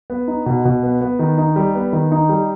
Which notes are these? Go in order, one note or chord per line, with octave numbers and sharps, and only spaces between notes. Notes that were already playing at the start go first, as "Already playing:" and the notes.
B3
D#4
B2
B2
B3
B3
D#3
D#4
G3
B3
D#3
D#4
G3